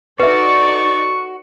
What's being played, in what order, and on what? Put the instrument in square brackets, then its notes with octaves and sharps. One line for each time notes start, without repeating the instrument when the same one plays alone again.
[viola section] D#4 A4 D5 [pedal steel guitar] F#4 [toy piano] B4 E5 [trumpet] C#6